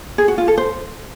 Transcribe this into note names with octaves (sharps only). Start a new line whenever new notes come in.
G#4
F#4
F4
A4
C5